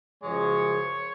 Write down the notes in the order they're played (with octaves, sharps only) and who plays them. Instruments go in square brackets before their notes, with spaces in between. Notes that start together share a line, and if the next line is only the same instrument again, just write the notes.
[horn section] F#2 C#3 F3 G#3 C#5